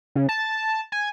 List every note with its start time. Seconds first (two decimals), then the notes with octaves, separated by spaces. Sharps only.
0.15 C#3
0.29 A5
0.92 G#5